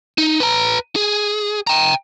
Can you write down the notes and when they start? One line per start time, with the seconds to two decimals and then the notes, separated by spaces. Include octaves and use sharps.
0.18 D#4
0.40 B4 A#5
0.96 G#4
1.67 G5 A#5